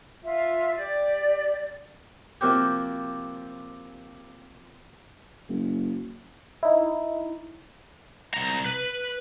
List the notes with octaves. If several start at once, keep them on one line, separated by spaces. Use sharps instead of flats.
F4 E5
G4 D5
C3 F3 A#3 C4 F#4 G4
F#1
D#4 E4
C2 A#5
B4